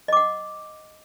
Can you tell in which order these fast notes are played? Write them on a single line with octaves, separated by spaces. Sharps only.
D#5 D6 F#5